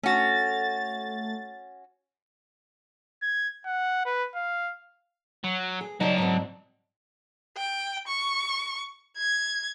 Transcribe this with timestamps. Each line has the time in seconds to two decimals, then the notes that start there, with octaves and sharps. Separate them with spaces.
0.03 A3 C#4 F#4 A6
3.22 G#6
3.66 F#5
4.05 B4
4.35 F5
5.44 F#3
5.81 G#4
6.00 F#3 G3 D#4 A5
6.18 G#2 C4
7.57 G5
8.07 C#6
9.17 G#6